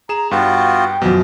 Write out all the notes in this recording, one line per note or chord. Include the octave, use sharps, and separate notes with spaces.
G#4 A#5 E7
G2 B3 F4 F#4 G5
F#2 B2 F3 F#3 G4